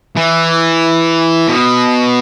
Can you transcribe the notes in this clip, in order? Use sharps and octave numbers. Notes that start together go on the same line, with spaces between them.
E3
B2